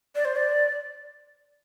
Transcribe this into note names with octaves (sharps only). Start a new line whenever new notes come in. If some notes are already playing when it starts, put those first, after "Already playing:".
D5
C5
D5